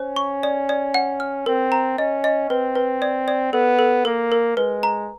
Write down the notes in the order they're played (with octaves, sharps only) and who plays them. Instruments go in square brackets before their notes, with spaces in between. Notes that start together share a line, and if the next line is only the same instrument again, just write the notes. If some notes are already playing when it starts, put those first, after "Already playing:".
Already playing: [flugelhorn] C#4 [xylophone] C5
[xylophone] C#6
D5
D5
F#5
F6
[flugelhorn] C4 [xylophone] A#4
[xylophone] A#5
[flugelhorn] C#4 [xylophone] D#5
[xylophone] D#5
[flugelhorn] C4 [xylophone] B4
[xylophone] B4
D5
D5
[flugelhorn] B3 [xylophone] A4
[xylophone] A4
[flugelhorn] A#3 [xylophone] A#4
[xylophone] A#4
[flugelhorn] G#3 [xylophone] B4
[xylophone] A#5